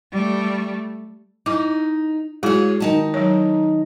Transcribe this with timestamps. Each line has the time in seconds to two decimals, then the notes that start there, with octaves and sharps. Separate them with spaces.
0.12 G3 A3
1.46 D#4 E4 D6
2.43 G#3 E4 F#4 G#4 C#5
2.80 D#3 D#4 A5
3.14 F#3 C#5